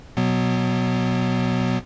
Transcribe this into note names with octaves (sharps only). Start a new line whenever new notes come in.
B2 F#3 B3